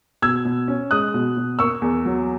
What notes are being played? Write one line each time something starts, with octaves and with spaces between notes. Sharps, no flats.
B2 E6 G#6
B2
C#4
G#3 D#6 F#6
B2
B2
A#3 C#6 E6
E2
F#3